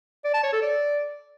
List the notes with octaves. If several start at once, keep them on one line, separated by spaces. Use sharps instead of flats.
D5
A5
C#5
A4
D5